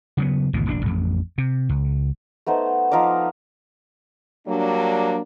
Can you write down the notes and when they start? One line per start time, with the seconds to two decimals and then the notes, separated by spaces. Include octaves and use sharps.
0.17 C#3 F#3 B3
0.53 G#1 D2 B2 E3
0.66 F1 A#1 C#4 D4
0.82 A1 F2
1.38 C3
1.69 C#2
2.46 A3 B3 D#4 C5
2.92 F3 D#4 F5 D6
4.48 F#3 G3 A#3 D4